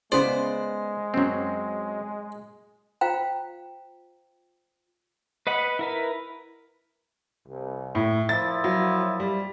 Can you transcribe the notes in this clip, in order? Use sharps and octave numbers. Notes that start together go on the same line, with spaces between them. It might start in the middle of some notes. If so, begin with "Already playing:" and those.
C#3 G#3 B3 G#4 C5 D5
F#2 F#3 C4 C#4
F4 C5 F5 G5 A#5
B4 D#5 F#5 B5
E4 A#4 B4
C2
A2
A#2 F3 E4 A6
F#3
G3